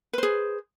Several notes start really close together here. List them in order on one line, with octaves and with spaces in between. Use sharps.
B4 C5 G#4